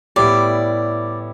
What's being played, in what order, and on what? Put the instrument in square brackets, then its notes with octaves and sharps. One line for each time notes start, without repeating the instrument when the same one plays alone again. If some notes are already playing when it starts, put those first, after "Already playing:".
[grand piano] A2 G3 B3 E4 G4 [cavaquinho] D5